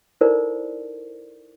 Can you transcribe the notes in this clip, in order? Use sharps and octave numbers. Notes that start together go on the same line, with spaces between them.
D#4 E4 A4 A#4 C5 D5